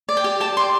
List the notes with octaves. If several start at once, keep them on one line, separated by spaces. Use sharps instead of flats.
D5
G5
G4
G4 A5
D5 C6